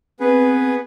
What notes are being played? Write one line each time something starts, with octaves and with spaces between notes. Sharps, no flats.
B3 C4 G#4 B4